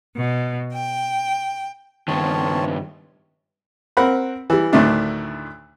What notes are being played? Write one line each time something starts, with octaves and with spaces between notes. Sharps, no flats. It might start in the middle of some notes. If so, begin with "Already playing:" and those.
B2
G5
G2 D#3 C4 C#5 A5
C4 A#4 F#5 B5
E3 G3
D2 A2 D#3 A3 D4